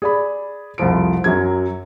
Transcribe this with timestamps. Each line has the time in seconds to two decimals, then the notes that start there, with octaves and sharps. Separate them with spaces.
0.02 G#4 D5 B5
0.78 C2 F2 F3 D7
1.24 F#2 F#3 G#6